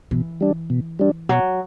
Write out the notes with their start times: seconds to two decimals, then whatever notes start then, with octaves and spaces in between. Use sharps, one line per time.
0.11 B2 E3
0.41 G3 D4
0.70 B2
0.99 G3 D4
1.29 B2 F#3